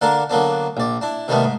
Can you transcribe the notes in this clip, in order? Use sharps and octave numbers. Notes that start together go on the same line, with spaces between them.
D3 A#3 D4 A4 A#4
D3 F#3 A#3 B3 D4
A#1 D5
D4 E4
C3 D#3 G3 A3 B3
G#2